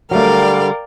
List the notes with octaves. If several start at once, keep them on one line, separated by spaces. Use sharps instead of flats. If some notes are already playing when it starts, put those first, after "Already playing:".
D3 F#3 G3 A3 A#4 D5 F5 G5